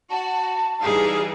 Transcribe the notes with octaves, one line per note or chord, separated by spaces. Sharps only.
F#4 A5
E3 G3 D#4 G#4 F5